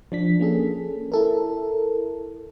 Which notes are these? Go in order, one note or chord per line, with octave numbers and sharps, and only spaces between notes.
F3 D4 B6
A#3 C#4 G#4 A4
E4 A4 A#4